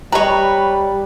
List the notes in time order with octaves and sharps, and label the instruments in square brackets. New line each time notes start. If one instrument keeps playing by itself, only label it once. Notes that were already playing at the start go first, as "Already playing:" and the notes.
[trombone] G3 [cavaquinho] B4 C#5 [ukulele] D#5 A#5